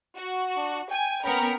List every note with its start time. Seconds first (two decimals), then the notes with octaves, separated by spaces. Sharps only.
0.15 F#4
0.56 D4
0.91 G5 G#5
1.24 B3 C#4 A#4 G5 B5